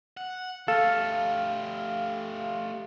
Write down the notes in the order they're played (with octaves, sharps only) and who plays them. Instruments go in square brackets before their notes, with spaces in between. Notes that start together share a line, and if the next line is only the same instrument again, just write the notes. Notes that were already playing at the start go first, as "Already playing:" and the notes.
[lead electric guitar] F#5
[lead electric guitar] A3 G4 [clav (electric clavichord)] A4 [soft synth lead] F5